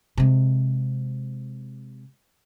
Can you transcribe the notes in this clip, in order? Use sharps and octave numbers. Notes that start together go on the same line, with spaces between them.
C3 G#3